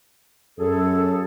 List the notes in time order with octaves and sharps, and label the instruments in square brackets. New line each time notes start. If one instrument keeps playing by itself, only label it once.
[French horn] F#2 [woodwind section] G#4 A4